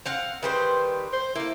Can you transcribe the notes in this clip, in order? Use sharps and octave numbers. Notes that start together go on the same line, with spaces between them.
C4 F5 F#5
D#3 G3 B4 C5
C5
A#3 E4 A4